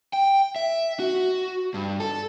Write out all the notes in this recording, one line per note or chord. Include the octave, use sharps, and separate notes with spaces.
G5
E5
F#4
G2
A4